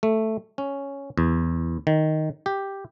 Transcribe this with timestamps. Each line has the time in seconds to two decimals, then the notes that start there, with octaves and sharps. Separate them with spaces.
0.03 A3
0.58 C#4
1.18 E2
1.87 D#3
2.46 G4